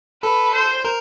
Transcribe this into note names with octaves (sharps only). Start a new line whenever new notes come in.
A4 B4
C5
A#4